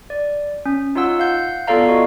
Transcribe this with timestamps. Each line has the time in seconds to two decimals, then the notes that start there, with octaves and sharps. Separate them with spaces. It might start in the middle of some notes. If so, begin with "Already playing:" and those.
0.10 D5
0.66 C#4
0.95 D#4 F4 C#5 F#5 E6
1.19 F5 F#5 G6
1.68 B3 F4 A4 D5 F5 A#5
1.89 F#4 D#5